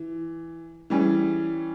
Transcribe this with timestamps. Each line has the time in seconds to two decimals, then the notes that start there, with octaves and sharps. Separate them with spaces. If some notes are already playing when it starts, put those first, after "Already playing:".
Already playing: E3
0.90 E3 G3 C#4 G#4